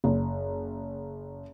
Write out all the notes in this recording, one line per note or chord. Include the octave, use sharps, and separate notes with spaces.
F#1